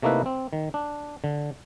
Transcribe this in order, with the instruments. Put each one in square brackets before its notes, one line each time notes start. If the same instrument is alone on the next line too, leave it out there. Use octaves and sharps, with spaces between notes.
[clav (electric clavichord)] C3 A3 A#3 D#4 E4 B4
C4
D#3
D4
D3